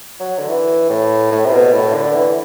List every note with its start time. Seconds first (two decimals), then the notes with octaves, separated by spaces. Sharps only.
0.20 F#3
0.38 D3
0.48 E3
0.90 A2
1.32 A2
1.46 C3
1.52 B2
1.73 A2
1.94 D3
2.15 E3